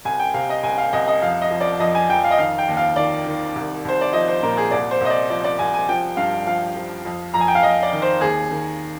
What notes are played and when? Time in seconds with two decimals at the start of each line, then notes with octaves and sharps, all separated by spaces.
0.05 C2 G#5
0.19 G5
0.34 C3 F5
0.49 D#5
0.63 C2 G#5
0.78 F5
0.93 C2 D#5
1.07 D#5
1.22 F2 F5
1.41 D#5
1.51 F3
1.61 D5
1.80 F2 D#5
1.95 G#5
2.09 F2 G5
2.24 F5
2.31 D#5
2.38 D#3 F5
2.58 G5
2.68 D#2
2.77 F5
2.96 D#3 D5
3.26 D#3
3.55 C2
3.85 C2 C5
4.01 D5
4.13 F3 D#5
4.28 C5
4.43 A#2 A#4
4.57 G#4
4.71 C2 D5
4.91 C5
5.00 C2 D#5
5.10 D5
5.30 F3 D5
5.44 D5
5.59 C2 G#5
5.74 G#5
5.89 F3 G5
6.17 G2 F5
6.47 F3 F5
6.76 F3
7.05 F2
7.34 F2 A#5
7.41 G#5
7.48 G5
7.55 F5
7.63 F2 D#5
7.83 D5
7.92 D#3
8.02 C5
8.21 D#2 G#4
8.51 D#3